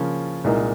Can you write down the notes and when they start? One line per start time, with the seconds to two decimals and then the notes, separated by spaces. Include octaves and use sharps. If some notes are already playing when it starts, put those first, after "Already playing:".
Already playing: C#3 F3 A#3 C#4 F4
0.44 C2 A#2 G#3 D#4 A#4